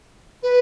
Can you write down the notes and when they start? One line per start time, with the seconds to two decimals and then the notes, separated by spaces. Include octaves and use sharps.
0.43 B4